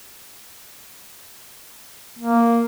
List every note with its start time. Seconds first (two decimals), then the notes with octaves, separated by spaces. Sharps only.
2.19 A#3